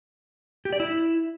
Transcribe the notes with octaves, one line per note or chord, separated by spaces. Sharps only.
G4
D5
E4